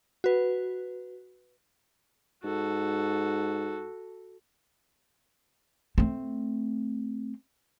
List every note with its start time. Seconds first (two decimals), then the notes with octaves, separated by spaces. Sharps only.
0.24 F#4 B4
2.44 G#2 F#4 A4
5.98 A3 C4